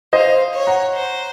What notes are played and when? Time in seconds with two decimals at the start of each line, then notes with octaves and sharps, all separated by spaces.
0.13 C5 D#5 F5
0.53 C#5
0.67 F#5 A#5
0.94 C5